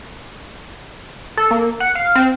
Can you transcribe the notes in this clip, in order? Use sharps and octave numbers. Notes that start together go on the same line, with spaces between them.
A4
A#3
F#5
F5
C4